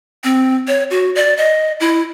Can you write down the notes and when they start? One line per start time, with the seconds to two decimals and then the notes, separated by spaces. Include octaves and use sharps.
0.24 C4
0.67 C#5
0.91 F#4
1.15 D5
1.37 D#5
1.80 E4